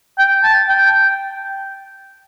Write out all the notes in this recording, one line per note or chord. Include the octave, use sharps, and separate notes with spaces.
G5
A5
G5